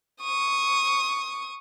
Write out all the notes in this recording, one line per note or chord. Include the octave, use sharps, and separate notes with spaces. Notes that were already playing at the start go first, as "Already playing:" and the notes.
C#6 D#6